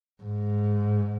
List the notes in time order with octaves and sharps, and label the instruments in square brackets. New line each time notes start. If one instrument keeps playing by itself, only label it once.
[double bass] G#2